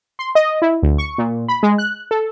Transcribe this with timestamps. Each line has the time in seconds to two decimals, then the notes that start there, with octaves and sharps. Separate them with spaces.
0.19 C6
0.35 D#5
0.62 E4
0.83 D2
0.98 C#6
1.18 A#2
1.48 B5
1.63 G#3
1.78 F#6
2.11 A4